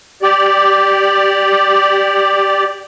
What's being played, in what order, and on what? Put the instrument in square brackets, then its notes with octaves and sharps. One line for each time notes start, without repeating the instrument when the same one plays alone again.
[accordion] G4 D5